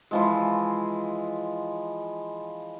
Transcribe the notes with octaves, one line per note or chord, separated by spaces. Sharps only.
E3 F3 G#3